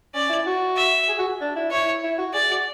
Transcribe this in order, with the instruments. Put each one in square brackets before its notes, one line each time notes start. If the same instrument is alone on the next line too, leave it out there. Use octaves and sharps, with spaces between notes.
[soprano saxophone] C#4 [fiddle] D5
[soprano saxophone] E4
F#4
[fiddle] E5
[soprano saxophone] G#4
F#4
D4
E4
[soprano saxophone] E4 [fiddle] C#5
[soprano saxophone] E4
F#4
[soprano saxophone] G#4 [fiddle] D5
[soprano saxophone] F#4